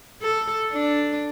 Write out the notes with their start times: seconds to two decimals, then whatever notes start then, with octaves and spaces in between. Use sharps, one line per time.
0.22 A4
0.72 D4